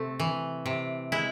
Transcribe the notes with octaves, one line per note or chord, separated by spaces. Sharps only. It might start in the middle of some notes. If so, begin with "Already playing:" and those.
Already playing: C3 A3 C4
E3
C3
G#3 E4